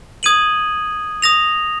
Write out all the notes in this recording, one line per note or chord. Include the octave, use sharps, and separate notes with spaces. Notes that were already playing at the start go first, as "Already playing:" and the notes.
D#6 G#6 D#7 F#7
D#6 A#6 F7